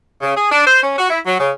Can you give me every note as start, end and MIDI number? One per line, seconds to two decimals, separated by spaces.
0.22 0.37 49
0.37 0.48 68
0.51 0.62 62
0.67 0.83 72
0.83 0.96 61
0.98 1.06 66
1.10 1.20 64
1.26 1.37 54
1.39 1.51 49